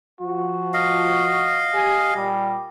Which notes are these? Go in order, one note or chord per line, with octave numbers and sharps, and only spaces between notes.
F3 F4 F#4
D#5 F5
G4 G#5
A#2 G3